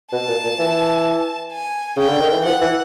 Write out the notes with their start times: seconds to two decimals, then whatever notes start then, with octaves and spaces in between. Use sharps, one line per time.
0.12 B2 A5
0.28 A#2
0.44 A#2
0.59 E3
1.53 G#5
1.96 C#3 G5
2.09 D3
2.21 D#3
2.33 E3
2.45 F3 F#5
2.61 E3